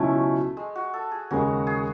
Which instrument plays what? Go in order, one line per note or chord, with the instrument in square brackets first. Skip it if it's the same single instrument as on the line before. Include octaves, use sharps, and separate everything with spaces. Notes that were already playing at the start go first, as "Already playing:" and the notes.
Already playing: [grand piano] C#2 B2 F#3 C#4 E4 [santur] A3
[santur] G#3
F#4
A4
G#4
[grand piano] D#2 C#3 G#3 [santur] F#4
[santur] G#4